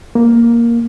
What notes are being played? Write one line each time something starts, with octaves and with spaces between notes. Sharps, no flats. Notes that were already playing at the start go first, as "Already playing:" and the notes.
A#3